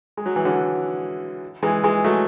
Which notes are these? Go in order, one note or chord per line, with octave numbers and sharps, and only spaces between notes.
G#3
F#3
E3
D3 F#3
E3 G#3
E3 G#3
F#3 A3